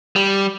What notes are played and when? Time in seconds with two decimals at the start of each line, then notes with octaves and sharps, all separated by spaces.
0.16 G3